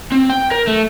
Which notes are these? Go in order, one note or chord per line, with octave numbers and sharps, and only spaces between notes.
C4
G5
A#4
A3